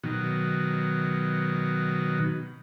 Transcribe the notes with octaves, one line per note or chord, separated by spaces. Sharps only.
B2 D#3 F#3